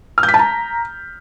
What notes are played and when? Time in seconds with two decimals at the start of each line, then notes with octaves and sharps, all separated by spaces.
0.18 F6
0.23 G6
0.29 B6
0.34 A5
0.39 A#5